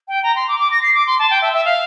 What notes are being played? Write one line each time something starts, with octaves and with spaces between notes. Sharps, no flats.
G5
A#5
C6
D6
D6
A#6
C7
D6
C6
A5
G5
E5
E5
F5